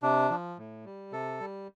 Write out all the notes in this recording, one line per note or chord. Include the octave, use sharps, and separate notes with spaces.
C3 D4
F3
A2
G3
C3 A4
G3